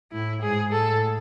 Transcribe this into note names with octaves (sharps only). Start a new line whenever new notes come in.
A2 E4
G#2 G#4
A2 A4